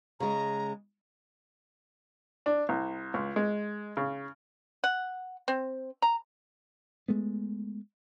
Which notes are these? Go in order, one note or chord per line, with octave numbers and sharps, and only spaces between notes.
C#3 G#3 A#5
D4
C2
C#2
G#3
C#3
F#5
C4
A#5
G#3 A3 B3